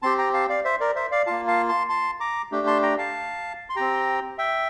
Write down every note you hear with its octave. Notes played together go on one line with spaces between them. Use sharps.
C4 G4 A5 C6
G5 A#5
F5 A5
D5 F5
C5 E5
A#4 D5
C5 E5
D5 F5
A#3 F4 F5 A5
F5 A5
A5 C6
A5 C6
A#5 D6
A3 D4 G4
A5 C6
G5 A#5
F5 A5
C6
C4 G4 G5 A#5
E5 G5